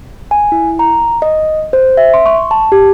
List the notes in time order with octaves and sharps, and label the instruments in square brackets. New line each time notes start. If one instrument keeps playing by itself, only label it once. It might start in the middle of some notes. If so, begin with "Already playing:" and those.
[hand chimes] G#5
E4
A#5
D#5
C5
E5
C6
C#6
A5
G4